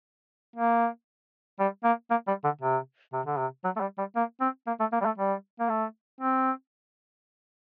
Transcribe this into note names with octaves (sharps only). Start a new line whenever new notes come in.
A#3
G3
A#3
A#3
G3
D3
C3
C3
D3
C3
F#3
A3
G3
G3
A#3
C4
A#3
A3
A#3
G3
A3
G3
A#3
A3
C4